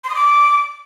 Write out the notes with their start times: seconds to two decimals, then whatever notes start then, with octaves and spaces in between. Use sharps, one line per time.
0.04 C6
0.10 D#6
0.15 D6